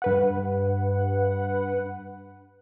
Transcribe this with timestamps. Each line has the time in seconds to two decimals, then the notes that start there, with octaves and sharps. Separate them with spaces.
0.02 G2 B4 F#5